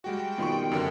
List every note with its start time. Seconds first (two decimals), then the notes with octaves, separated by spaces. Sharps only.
0.04 G3 G#3 F#4 G5
0.38 B2 D#3 G3 F4 C6 C#6
0.72 F#2 D3 A#4